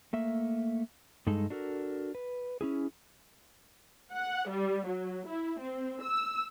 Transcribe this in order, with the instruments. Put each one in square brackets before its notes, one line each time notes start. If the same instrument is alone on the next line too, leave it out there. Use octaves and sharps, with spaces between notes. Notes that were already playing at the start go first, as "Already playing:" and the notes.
[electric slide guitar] A3 A#3 E5
G2 G#3 D#4 A4
D4 F#4 A4 A#4
B4
C#4 E4 G#4
[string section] F#5
G3
F#3
E4
C4
E6